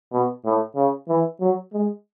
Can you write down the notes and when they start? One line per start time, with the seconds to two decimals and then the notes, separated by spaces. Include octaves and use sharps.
0.12 B2
0.45 A2
0.76 C#3
1.09 E3
1.41 F#3
1.73 G#3